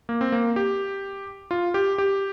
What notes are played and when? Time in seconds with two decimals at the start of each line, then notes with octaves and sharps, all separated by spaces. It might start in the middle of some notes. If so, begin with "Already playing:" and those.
0.09 A#3
0.21 C4
0.32 A#3
0.56 G4
1.51 F4
1.74 G4
1.98 G4